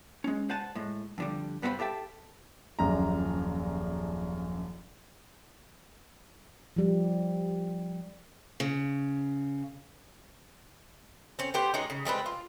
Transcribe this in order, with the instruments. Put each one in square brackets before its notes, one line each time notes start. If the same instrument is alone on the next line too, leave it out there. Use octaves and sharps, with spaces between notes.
[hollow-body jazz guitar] G#3 C#4
C5 F#5 G#5 A5
A2 G#3
F2 D3 G3
G2 B3 C4 A4 C5 B5
G4 A4 E5 G5 A5
[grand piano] D#1 A#1 F#2 A#5
[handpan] F3 G3
[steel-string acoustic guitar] C#3
[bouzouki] C4 C#4
B3 G4 C5
G#3 C#4 D#4 F#4
C#3
G3 G#3 C4 B4
F4